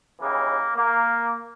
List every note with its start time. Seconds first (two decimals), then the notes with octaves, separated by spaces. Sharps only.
0.20 D#2 C#3 E3 A#3
0.75 A#3